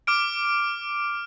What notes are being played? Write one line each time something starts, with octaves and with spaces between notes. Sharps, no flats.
D6 F6 D7